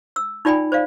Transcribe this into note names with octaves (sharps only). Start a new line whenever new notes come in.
E6
D#4 F4 D5 G5 G#5 B5
C5 D5 F5